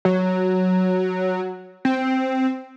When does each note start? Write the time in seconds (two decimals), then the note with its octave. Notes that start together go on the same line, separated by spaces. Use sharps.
0.05 F#3
1.85 C4